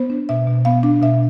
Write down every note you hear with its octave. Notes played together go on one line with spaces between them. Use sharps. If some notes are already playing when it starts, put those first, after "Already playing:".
Already playing: B3 C5
D4
B2 E5
B2
B3 F5
D4
B2 E5